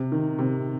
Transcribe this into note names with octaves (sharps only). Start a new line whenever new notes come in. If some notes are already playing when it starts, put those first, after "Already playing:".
Already playing: C3
D#3
C3